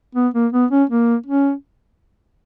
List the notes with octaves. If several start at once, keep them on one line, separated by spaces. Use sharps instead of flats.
B3
A#3
B3
C#4
A#3
C#4